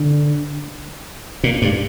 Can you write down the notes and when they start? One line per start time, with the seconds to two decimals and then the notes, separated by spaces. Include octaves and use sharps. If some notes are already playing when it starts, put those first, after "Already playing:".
Already playing: D3
1.44 A#2
1.62 G2